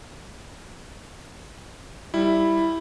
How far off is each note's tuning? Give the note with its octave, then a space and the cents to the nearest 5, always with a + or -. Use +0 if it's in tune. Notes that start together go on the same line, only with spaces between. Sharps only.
G3 +0 E4 +0